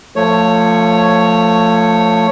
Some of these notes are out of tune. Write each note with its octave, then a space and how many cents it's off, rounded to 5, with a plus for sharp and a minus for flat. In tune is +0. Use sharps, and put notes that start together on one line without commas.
F3 +0 A3 +25 C#5 +0